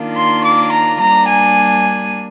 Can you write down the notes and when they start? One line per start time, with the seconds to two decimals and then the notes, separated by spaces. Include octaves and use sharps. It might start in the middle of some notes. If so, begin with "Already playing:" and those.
Already playing: D#3 A#3 D4 F4
0.16 C6
0.44 D6
0.72 A#5
1.01 G3 A#3 D4 A#5
1.29 G#5